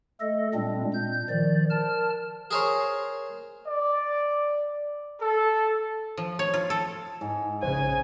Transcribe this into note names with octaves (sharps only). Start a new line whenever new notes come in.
A3 A4 D#5
A#2 G3 G#3 C4 D4
A#2 G6
D#3 F3 D5
A#4 A5 F6
G#4 A#4 C5 C#5
D5
A4
F3
C#5
F4
A4
G#2
A#1 C#3 C5 G#5